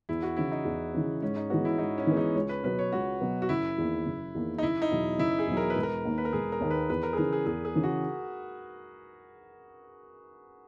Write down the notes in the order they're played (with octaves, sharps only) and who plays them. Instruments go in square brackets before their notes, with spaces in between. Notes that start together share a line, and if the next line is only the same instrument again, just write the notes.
[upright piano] E2 [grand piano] E4
[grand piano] F#4
[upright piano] C#3 E3 [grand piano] E4
[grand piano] D#4
[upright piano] E2
C#3 E3
[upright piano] G#2 [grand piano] C#4
[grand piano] D#4
[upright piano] E3 G#3 B3 [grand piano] F#4
[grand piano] E4
[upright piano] G#2 [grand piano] D#4
[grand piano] C#4
[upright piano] E3 G#3 B3
[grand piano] D#4
[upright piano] C#2 [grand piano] C#5
[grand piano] B4
[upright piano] B2 F#3 B3 [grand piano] B4
[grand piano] C#5
[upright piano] C#2 [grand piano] F#4
[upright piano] B2 F#3 B3
[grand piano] F#4
[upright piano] F#1 [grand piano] E4
[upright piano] E2 D#3 A#3
F#1
E2 D#3 A#3
[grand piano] D#4
[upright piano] F#1 [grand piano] E4
[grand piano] D#4
[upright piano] E2 B2 F#3
[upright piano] F#1 [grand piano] E4
[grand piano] G#4
[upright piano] E2 B2 F#3
[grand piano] A#4
B4
[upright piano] E1
[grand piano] A#4
[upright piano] D#2 D#3 A#3
[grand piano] B4
A#4
[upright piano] E1 [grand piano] G#4
[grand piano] A#4
[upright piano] D#2 D#3 A#3
[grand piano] B4
[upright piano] E2 [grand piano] B4
[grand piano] A#4
G#4
[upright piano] C#3 E3 [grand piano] A#4
[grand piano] G#4
[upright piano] E2 [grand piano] G#4
[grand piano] G#4
[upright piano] C#3 E3
[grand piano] F#4